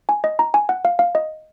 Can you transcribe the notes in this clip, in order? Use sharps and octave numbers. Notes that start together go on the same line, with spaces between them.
G#5
D#5
A#5
G#5
F#5
F5
F5
D#5